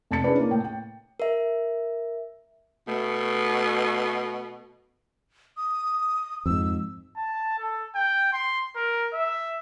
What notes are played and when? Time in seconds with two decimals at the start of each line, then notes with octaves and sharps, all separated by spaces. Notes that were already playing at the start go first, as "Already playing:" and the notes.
0.11 F1 A5 A6 C#7
0.24 C#4 D4 E4 G#4 B4 D5
0.39 A#3 C#5
0.51 A2 G5
0.64 G5
1.20 A#4 E5
2.88 B2 A3
5.57 D#6
6.46 F2 G#2 E6
7.17 A5
7.58 A4
7.95 G5
8.33 C6
8.76 A#4
9.13 E5